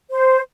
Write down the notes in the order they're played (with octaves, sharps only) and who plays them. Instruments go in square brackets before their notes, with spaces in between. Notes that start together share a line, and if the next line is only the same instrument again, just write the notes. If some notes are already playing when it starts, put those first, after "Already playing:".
[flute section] C5